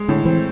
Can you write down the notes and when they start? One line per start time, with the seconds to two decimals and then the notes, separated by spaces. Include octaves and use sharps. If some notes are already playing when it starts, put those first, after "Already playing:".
Already playing: G#3
0.08 A2 D3
0.25 E3 C4